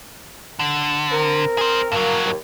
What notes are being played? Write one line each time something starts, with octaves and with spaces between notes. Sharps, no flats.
D3
C4 A#4
G#4 C5
G2 F#3 A#3
D#2